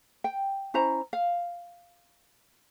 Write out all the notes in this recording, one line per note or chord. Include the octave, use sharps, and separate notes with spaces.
G5
C#4 E4 C5 A#5
F5